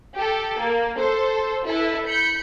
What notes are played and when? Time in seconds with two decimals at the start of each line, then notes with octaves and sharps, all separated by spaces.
0.14 G4 A4
0.58 A#3
0.97 A4 C5
1.66 E4 A4 B4
2.05 B5 G6 C#7